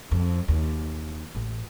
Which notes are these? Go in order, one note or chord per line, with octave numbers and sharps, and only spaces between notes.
F2
D#2
A1